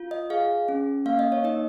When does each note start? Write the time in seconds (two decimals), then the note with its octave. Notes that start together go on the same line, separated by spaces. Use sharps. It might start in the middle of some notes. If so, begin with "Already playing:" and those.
Already playing: F4
0.11 D#5
0.30 G#4 F5
0.68 C#4
1.06 A#3 F5
1.19 D#5
1.32 C#5
1.44 D#4 D#5